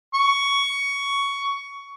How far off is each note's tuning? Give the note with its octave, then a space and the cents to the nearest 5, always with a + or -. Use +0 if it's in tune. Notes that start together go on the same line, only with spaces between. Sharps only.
C#6 +15